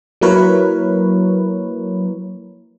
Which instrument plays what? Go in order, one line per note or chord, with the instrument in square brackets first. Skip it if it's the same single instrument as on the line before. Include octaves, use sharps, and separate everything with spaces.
[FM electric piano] F#3 A#3 E4 A#4 B4 C#5